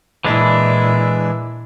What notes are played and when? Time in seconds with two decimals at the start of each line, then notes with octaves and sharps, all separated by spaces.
0.24 A#2 E3 G#3 D4 E4